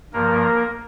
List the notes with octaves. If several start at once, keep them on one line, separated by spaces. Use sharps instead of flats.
G2 F3 A#3 A#4